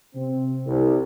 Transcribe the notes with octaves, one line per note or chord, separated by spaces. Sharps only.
C3 C4
C2